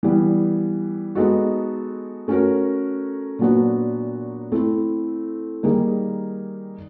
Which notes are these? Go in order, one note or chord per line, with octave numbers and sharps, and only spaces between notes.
E3 G3 B3
G#3 B3 D#4 F#4 A4
A3 C#4 F#4 A#4
A#2 F#3 B3 D4 F#4
A3 C4 E4
D#3 G3 A#3 D#4 G#4